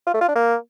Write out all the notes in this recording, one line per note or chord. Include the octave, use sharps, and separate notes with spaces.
F4
A3
F4
D4
A#3